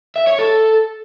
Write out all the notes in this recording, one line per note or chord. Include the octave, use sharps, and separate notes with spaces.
E5
C#5
A4